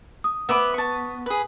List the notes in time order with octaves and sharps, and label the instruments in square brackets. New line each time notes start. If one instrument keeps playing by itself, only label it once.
[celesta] D#6
[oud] B3 [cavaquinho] E5 B5 D6
[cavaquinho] A5 C#6
G#4 B4